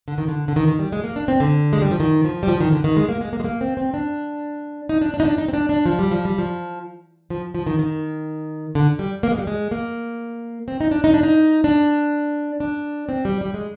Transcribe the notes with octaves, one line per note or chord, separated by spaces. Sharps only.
D3
D#3
D3
D3
D#3
D#3
G3
G#3
A#3
D4
C4
D3
G#3
G3
F3
D#3
F3
G3
F3
D#3
D3
D#3
G#3
A#3
G#3
A#3
G#3
A#3
C4
C4
D4
D#4
D4
D4
D#4
D4
D#4
C4
D4
D4
F3
G3
F3
G3
F3
F3
F3
D#3
D#3
D3
G3
A#3
G#3
G3
G#3
A#3
C4
D#4
D4
D#4
D4
D#4
D4
D4
C4
G3
G3
G#3